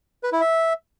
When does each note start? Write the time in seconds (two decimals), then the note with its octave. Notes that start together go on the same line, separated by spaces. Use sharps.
0.23 B4
0.32 E4
0.41 E5